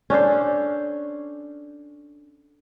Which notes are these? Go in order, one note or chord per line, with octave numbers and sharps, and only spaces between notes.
C#4 D4 A4 C5